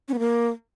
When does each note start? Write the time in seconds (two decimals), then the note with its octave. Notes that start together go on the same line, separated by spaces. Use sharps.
0.08 C#4
0.14 B3
0.19 A#3